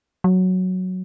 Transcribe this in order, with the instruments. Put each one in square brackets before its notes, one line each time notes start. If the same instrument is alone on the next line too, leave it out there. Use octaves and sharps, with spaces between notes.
[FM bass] F#3